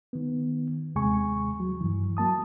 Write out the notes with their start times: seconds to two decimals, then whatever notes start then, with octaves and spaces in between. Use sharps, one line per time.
0.13 D#3 B3
0.95 D#2 C3 G#3 G#5 C#6
1.60 F#3
1.81 G2 E3
2.17 F#3 A#3 A5 D#6